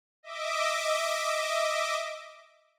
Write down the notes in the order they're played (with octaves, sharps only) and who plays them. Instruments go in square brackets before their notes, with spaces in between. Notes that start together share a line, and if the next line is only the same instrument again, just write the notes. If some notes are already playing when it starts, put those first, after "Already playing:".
[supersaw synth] D#5 E5 D6